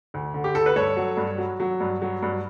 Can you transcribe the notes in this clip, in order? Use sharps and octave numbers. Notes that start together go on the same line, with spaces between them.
D2
D3
G4
D2 A4
B4
G2 A4 C#5
F#3
G2
F#3
F#3
G2
F#3
G2